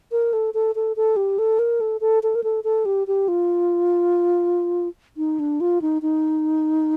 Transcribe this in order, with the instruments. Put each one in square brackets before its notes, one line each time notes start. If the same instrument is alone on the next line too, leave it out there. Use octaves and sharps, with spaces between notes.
[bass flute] A#4
A4
A4
A4
A4
G4
A4
A#4
A4
A4
A4
A#4
A4
A4
G4
G4
F4
D#4
D4
F4
D#4
D#4